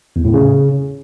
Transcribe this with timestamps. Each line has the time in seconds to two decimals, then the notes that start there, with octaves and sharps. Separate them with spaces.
0.16 E2
0.25 A2
0.34 C#3